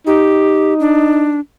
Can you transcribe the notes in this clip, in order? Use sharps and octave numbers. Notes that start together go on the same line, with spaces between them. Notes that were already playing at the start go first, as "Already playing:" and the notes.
D#4 G4
D4